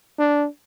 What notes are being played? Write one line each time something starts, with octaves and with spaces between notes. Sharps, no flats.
D4